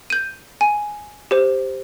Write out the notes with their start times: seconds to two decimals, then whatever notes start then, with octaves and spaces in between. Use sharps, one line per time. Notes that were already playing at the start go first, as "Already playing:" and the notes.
0.10 G6 D#7
0.61 G#5
1.31 G4 C5